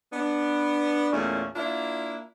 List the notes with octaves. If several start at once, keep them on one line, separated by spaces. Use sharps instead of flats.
B3 D4
E2 A#2 A3 C#4
A#3 D4 E4 F4